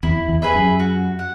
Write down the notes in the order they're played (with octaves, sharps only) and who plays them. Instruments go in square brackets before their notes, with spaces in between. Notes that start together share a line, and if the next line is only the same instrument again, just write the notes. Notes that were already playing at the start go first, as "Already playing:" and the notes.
[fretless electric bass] E2 [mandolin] E4
[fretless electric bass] E2
[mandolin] G#4 B4 E5
[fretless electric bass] F#2
[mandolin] F#4
F#5